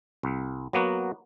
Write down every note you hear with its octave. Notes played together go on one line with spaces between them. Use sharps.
C2
F#3 A#3 B3 F#4